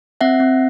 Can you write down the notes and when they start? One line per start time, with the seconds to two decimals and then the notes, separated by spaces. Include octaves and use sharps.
0.21 C4 E5 F#5
0.40 C4